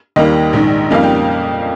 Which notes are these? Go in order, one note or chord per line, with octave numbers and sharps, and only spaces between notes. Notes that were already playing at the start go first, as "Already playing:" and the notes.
D#2 D#3 G3 A#3 D#5
A#1 G#2 D#3
F2 C#3 G3 A#3 D#4 F5
G5